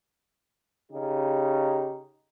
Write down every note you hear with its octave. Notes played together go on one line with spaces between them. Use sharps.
C#3 D#4 G4